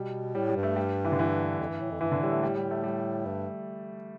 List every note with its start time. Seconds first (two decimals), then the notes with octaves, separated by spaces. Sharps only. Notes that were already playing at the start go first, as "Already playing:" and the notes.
Already playing: B2 G3
0.35 A2 G3
0.49 G3
0.56 G2
0.63 A3
0.76 G3
1.05 E3
1.12 D3
1.19 E3
1.60 F2
1.69 G2
1.80 A2
1.91 F2
2.01 G2 E3
2.12 D3
2.22 A2 G3
2.32 A3
2.43 G3
2.56 G3
2.71 A3
2.83 G3
3.26 G2